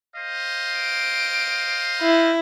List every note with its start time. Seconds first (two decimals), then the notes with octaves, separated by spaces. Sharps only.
0.16 C5 D#5 F5
0.79 D7
2.01 E4